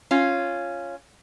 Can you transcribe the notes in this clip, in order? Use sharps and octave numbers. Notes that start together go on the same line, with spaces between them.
C#4 F4